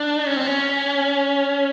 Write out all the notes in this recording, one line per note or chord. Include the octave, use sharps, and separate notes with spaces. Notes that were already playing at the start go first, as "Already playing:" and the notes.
Already playing: D4
C#4
C4
C#4